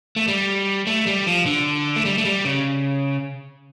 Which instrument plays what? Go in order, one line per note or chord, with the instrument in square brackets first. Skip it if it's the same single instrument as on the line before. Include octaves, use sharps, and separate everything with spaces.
[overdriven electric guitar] A3
G3
A3
G3
F3
D3
A3
G3
A3
G3
C#3